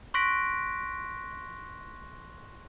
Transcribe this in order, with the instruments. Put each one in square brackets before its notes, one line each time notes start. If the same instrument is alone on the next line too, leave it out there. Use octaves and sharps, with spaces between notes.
[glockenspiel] C6 C#6 F#6 A#6 B6 D7